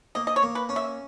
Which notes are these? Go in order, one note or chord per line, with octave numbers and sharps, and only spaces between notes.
A#3 D#5
D#5
C#5
A#3
B4
C#4
E5